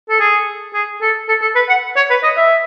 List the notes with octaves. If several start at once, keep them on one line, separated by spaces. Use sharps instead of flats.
A4
G#4
G#4
A4
A4
A4
B4
F#5
C#5
B4
D#5
E5